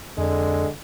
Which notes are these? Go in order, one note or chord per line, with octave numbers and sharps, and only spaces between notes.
F2 D3 G#3